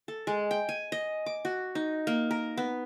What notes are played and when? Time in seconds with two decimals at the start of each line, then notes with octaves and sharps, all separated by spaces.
0.08 A4
0.27 G#3
0.51 G5
0.69 G#5
0.92 D#5
1.26 D6
1.45 F#4
1.75 D#4
2.07 A#3
2.31 A#4
2.57 B3